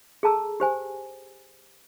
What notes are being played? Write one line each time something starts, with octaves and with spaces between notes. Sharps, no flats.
G#4 A4 A5 A#5 E6
G4 C5 G#5